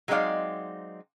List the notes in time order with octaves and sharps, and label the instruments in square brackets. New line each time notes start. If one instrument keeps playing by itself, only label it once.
[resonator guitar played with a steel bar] F#3 G#3 C4 D#4 D5 F5